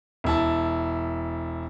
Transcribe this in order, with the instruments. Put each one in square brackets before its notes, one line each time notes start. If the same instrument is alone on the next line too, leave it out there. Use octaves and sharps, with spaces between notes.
[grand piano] E1 E4 A5